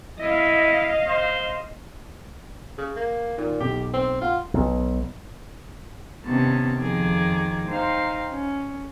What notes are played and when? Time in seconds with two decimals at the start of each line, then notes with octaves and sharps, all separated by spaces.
0.19 E4 D#5 F5
1.07 C5
2.78 C#3
2.96 A#3
3.38 A#2 D#3
3.60 B1 G4
3.94 C4
4.22 F4 F#5
4.54 B1
6.24 C3 D#3 B3 C#4 A5
6.78 F2 D#3 F3 G#4 D6
7.69 D#4 C5 F5 G5
8.31 C#4